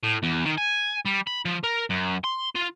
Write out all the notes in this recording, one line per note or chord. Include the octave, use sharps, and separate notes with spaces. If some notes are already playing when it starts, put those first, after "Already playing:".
A2
E2
D#3
G#5
G3
B5
F3
A#4
F#2
C6
F4